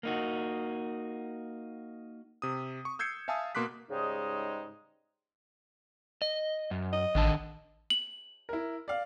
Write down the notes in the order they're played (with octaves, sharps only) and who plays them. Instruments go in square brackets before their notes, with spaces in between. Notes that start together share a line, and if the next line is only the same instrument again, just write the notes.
[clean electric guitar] A#3 D#4 F#4
[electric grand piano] C3 D#6
C#6
E6 G6 G#6 C7 C#7
E5 F5 G#5 A5 D#6 E6
B2 A#3 C6 D6 F#6 B6
[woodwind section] G#2 C#3 G3 G#3 D#4
[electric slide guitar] D#5
F#2
[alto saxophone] D#5
[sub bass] A1 [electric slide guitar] D#3 D4 A5
[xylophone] F#7
[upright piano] E4 A#4
D5 F5